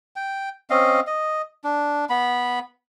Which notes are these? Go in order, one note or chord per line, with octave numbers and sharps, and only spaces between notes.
G5
C4 C#4 D#5 F5
D#5
D4
B3 B5